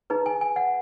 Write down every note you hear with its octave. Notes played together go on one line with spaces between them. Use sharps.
D#4 G#4 B4 A#5
G#5
G#5
F#5